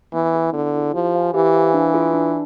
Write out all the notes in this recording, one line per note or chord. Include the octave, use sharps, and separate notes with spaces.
E3 B3
E4 G#4
D3 B3
E4 G#4
F3 G4
C5 F5 G#5
E3 G4
C5 F5 G#5
D4
F4 G#4 B4
D4